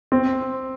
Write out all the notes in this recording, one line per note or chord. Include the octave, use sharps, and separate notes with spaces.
C4